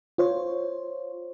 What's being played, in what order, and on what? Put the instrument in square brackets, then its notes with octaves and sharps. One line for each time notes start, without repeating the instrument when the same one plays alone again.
[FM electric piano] F4 C5 C#5